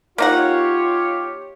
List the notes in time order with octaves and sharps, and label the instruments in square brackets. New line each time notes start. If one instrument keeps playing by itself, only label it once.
[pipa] A#3 D#4 F#5 [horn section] F4 [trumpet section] G4 C#5